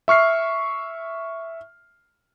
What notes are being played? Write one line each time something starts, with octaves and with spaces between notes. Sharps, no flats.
E5 C#6 F6 C7